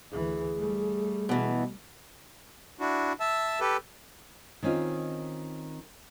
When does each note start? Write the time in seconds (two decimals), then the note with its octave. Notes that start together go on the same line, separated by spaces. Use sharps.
0.12 D2 E3 G#4
0.57 G3 A3
1.29 B2 E3
2.80 D4 E4 F#4
3.20 E5 A5 E6
3.60 G4 A4 B4
4.62 D#3 C4 C#4 D#4 F4